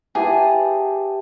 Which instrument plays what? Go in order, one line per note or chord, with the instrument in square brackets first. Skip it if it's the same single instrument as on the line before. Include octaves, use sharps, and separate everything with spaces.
[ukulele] E4 B4 [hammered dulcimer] G4 A5 [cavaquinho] G#4